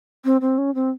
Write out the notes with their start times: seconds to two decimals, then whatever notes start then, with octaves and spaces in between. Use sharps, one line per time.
0.25 C4
0.41 C4
0.58 C#4
0.75 C4